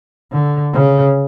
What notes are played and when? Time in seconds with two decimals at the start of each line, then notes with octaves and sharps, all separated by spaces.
0.32 D3
0.73 C#3